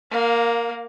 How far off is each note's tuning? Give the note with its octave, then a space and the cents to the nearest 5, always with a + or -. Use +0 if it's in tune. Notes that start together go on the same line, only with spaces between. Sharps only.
A#3 +0 F5 +30